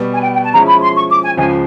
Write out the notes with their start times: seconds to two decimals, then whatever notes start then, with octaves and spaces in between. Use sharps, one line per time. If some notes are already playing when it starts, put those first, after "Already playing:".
Already playing: B2 G3 B3
0.12 G#5
0.22 G5
0.32 G5
0.44 A5
0.54 F3 G#3 C#4 E4 A#5
0.68 B5
0.82 C6
0.96 C#6
1.10 D6
1.23 G#5
1.37 C#2 C#3 F3 G#3 G#5